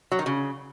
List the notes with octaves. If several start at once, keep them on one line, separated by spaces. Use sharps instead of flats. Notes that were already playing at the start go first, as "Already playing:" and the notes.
F#3
D#3
C#3